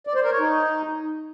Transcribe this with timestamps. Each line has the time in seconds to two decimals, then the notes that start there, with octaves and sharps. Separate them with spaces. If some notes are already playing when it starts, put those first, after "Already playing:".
0.07 D5
0.15 C5
0.23 A#4
0.31 C#5
0.40 D#4